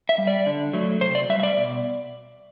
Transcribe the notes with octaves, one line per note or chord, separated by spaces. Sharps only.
E5
G3
D5
D3
F#3 A3
C3 C5
D5
G3 E5
E5
D5
B2